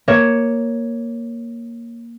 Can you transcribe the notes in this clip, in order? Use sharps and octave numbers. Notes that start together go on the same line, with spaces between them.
A#3 C#5 E7